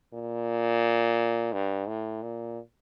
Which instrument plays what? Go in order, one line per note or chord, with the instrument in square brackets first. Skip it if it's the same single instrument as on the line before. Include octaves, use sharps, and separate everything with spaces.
[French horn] A#2
G2
A2
A#2